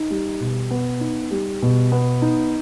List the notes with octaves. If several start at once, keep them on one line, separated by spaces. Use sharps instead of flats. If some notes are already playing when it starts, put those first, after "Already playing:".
Already playing: D#4
G3
B2
B3
D#4
G3
B2
B3
D#4